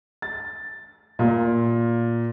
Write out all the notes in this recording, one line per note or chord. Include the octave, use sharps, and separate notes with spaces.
A6
A#2